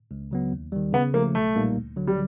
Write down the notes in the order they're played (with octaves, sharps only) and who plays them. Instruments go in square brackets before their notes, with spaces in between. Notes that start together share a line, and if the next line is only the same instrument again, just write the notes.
[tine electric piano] C#2
C#3 F#3 B3
D#2
D#3 G3
[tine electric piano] C#3 [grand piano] B3
[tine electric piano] F3 A3 [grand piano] A#3
[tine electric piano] B1 [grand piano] A3
[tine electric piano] A#2 G3 A#3 D#4
D2
D3 F#3
[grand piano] G3